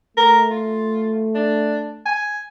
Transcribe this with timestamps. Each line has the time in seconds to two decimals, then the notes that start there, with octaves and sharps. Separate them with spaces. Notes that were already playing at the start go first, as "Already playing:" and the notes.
0.17 A3 A#4
0.51 F4
1.35 D4
2.06 G#5